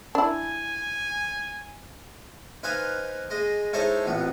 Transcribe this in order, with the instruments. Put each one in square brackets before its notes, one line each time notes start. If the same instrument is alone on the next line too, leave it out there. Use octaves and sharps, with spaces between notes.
[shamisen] D4 E4 [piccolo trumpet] G#5
[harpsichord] D#4 B4 C5 F5 G#5
G#3 D#5
G#3 D#4 E4 A4 C5 C#5
A1 F2 B3